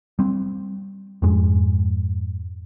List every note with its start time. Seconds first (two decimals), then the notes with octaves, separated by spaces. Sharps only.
0.19 G3 C4
1.22 F2 G#2 G#3